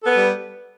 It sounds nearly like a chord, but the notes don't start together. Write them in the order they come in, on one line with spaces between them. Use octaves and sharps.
A4 B3 B4 G3